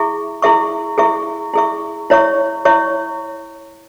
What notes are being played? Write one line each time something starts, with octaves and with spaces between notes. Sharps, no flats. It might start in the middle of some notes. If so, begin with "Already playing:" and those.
Already playing: E4 G#4 E5 C#6
E4 G#4 E5 C#6
E4 G#4 E5 C#6
E4 G#4 E5 C#6
E4 C#5 E5 C#6
E4 C#5 E5 C#6